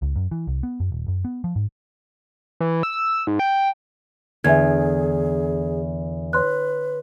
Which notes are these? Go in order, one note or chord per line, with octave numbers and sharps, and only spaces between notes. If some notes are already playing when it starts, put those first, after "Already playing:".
C#2
F#2
E3
C2
B3
F#2
D#1
F#2
B3
F3
G#2
E3
E6
G#2
G5
E2 D3 G#4 E5 G#5 G#6
B4 C#5 C6 F#6